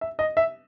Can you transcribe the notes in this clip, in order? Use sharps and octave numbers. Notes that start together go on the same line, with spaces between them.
E5
D#5
E5